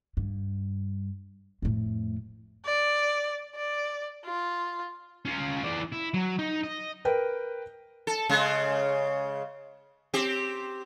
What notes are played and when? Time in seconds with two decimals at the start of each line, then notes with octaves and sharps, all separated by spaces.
0.17 G2
1.62 F2 A2
2.65 D5
3.55 D5
4.25 F4
5.25 C#4 F4
5.63 E3 D5
5.92 E4
6.14 F#3
6.39 D#4
6.64 D#5
7.05 A#4 B4 G5
8.07 A4
8.29 C#3 G#3
10.13 C4 G4